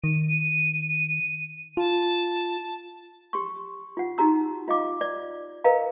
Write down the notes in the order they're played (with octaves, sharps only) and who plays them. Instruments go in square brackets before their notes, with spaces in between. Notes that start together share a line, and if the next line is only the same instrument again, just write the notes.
[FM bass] D#3 [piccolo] D#7
[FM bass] F4 [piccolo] A5
[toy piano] G4 C6 C#6
F4 F#5
D#4 F#4 G4 A#5 E6
F4 D#5 F5 D6
D5
A#4 B4 D#5 F5 G5 A#5